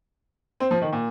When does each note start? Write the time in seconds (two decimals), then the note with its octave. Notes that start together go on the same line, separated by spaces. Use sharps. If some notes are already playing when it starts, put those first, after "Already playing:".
0.60 C4
0.71 F3
0.82 D#3
0.93 A#2